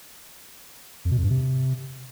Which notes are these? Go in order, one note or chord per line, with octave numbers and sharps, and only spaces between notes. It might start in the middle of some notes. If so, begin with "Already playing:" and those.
F2
B2
F2
G2
C3